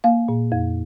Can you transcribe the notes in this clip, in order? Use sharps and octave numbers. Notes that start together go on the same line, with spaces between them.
A#3 F5
A#2
F2